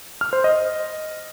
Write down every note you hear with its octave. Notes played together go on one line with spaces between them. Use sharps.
F6
C5
D#5